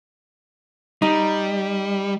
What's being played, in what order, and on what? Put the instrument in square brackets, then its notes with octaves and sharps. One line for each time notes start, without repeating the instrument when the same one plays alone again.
[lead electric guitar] G3 [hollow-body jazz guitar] D#4